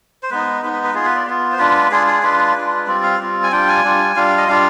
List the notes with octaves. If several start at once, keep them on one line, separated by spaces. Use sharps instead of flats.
C5
G#3 B3 D#4 B4
G#3 B3 D#4 B4
B4
B4
B3 F4 G#4
B4
D5
B3 F4
C5
G#3 D4 F4 B4
G#3 D4 F4 G#4
G#4
G#3 D4 F4 B4
G#3 D4 F4
G3 C4 F4 D5
F5
G3 C4 F4
G#5
G3 D4 F4 G5
G#5
G3 D4 F4
G3 D4 F4 F5
D#5
G3 D4 F4 F5